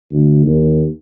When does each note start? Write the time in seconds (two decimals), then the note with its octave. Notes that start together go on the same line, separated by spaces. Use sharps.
0.11 D2
0.45 D#2